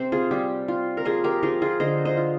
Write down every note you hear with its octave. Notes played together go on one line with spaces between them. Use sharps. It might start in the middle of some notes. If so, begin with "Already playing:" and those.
Already playing: C3 C4 C5
F4 G#4
G3 G4
F4
A#4
F3 F4 G#4
G4 A#4
F3 F4 G#4
F4 G#4
D3 C5 D#5
C5 D#5
F4